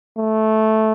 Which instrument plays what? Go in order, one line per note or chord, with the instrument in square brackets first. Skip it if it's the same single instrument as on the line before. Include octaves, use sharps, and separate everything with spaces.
[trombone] A3